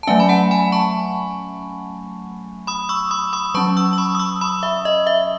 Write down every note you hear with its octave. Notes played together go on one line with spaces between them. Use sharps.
A5
F#3 A3 C#4 E5 G#5
B5
F#5 A5
G#5 B5
A5 C#6
B5 D#6
C#6 E6
B5 D#6
B5 D#6
F#3 C#4 A5 C#6
C#6 E6
C#6
B5 D#6
D#6
C#6 E6
B5 D#6
E5
D#5
E5